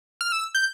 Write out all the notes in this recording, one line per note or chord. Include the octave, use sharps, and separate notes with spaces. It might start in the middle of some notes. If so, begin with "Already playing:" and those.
F6
E6
G6